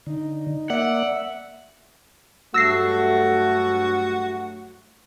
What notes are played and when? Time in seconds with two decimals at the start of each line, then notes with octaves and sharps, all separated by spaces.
0.06 D3 D#4
0.70 A#3 D5 E5 F#5
2.54 G2 F#3 A3 F#4 E6 A#6 C7